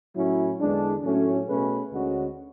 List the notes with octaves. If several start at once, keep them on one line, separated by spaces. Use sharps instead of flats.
A2 F#3 C#4 E4
E2 D3 G#3 D4
A2 F#3 A3 C#4
B2 A3 C#4 G#4 B4
D2 D3 G#3 C#4 F#4